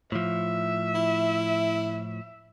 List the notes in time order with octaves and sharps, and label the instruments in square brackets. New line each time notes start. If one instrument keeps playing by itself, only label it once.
[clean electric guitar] A2 F3 [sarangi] E5
[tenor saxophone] E4